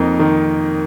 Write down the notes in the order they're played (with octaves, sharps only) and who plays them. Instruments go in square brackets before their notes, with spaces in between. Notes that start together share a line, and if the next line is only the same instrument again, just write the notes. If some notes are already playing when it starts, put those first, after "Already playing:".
Already playing: [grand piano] F2 A#3 D#4
D#3